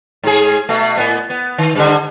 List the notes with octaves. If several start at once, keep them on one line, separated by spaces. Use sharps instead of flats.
G#2 G#4
B2 A3
A2 B3
B3
D#3
G2 D3